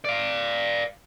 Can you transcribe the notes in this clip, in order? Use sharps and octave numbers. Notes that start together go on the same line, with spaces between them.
D5 F5